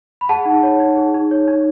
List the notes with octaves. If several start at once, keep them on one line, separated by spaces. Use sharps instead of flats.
B5
G#4 F#5 A5
D#4
C#5
D#4
G#4
D#4
C#5
D#4